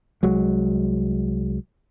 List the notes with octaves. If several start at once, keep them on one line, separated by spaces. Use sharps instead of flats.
C2 F#3 G#3